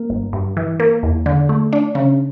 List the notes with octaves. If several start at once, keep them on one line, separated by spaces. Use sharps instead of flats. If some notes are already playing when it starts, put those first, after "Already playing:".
Already playing: A#3
G1
G2
E3
A#3
E2
D3
A3
D4
C#3